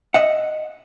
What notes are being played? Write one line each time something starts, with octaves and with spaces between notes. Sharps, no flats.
D#5 E5 F#5